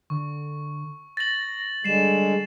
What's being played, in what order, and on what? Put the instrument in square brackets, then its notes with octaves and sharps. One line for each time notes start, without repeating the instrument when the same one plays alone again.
[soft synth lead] D3 [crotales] C#6
[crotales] A6 F#7 [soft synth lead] A#6
[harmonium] D3 G#3 [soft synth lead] G3 [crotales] C7 E7